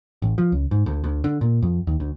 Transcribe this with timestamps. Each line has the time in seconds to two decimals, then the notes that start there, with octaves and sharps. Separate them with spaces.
0.22 A1
0.38 F3
0.52 C#2
0.71 G#2
0.86 D2
1.04 D2
1.24 D3
1.41 A#2
1.62 F2
1.87 D#2
2.00 D2